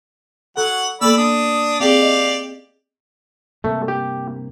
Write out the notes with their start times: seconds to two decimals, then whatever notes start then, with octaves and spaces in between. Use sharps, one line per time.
0.57 F#3 A4 F#5
1.01 A#3 B3 A4 D5 B5 E6
1.17 D4 D#6
1.80 C4 G4 G#4 D5 F5
2.02 D#5
3.64 G2 C3 A3 A#3
3.88 G4